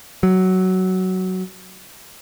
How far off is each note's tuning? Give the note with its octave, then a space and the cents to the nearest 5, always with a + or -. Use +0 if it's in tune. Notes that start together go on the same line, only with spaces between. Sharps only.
F#3 +10